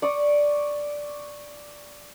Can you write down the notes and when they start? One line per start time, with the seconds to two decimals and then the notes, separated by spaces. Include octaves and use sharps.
0.02 D5 C#6 D#6